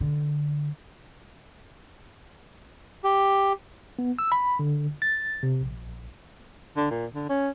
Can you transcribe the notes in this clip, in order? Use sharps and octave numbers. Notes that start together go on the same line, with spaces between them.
D3
G4
B3
E6
B5
D3
A6
C3
A#1
D3
A#2
D3
C#4